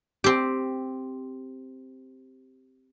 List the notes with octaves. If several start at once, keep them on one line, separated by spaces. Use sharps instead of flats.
C4 G4